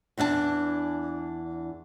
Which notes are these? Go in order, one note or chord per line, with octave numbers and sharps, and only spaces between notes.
E2 E3 D4 E5 A5